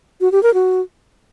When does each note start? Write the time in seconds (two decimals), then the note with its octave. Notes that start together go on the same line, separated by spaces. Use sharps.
0.21 F#4
0.32 G4
0.43 A#4
0.54 F#4